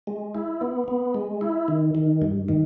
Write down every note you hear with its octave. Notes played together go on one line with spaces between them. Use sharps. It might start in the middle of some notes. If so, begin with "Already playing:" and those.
G#3
E4
B3
B3
G#3
E4
D#3
D#3
G2
D#3